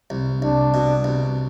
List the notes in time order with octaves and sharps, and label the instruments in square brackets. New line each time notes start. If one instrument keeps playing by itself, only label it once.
[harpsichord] C2
[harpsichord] C2 [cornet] D4
[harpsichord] B2
C2